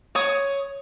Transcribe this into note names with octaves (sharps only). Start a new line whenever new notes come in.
C#5 D#6